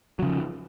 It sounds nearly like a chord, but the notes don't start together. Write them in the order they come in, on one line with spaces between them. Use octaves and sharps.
F#3 C#3 F3